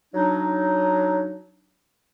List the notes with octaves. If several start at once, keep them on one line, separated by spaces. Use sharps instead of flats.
F#3 D4 D#4